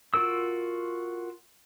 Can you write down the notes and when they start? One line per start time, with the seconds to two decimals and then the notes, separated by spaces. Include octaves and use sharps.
0.14 F4 F#4 A#4 E6